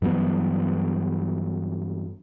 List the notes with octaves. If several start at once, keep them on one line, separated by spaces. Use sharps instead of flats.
G2 E3 F#3 B3